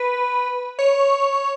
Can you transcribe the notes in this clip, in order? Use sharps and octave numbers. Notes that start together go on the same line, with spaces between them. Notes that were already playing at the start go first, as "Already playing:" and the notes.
Already playing: B4
C#5